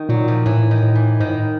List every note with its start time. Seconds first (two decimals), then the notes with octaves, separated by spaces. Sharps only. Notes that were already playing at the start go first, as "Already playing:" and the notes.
Already playing: D#3
0.09 A#2 F#3
0.28 F3
0.46 A2 E3
0.71 D#3
0.83 A2
0.95 E3
1.20 G#2 D#3
1.27 A2